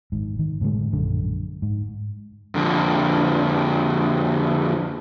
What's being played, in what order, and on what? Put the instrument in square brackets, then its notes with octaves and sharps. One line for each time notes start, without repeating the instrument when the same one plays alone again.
[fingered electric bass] G#1 G#2
D#3
A2 D3 G3 G#3
A#1 F#2 D3
G#2
[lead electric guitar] F2 D3